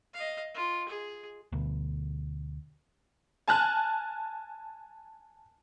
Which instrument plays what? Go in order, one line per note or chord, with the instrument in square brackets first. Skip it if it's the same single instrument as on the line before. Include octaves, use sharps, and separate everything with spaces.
[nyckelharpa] D#5 F5
F4
G#4
[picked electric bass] D2 B2
[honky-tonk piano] G#5 A5 F6 F#6